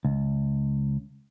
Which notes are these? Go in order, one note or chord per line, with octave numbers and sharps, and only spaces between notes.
C#2